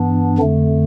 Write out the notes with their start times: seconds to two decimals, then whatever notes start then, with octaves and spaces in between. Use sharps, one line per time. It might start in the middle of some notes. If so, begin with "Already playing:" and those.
Already playing: G2 E3 B3 D4
0.38 F2 D3 A3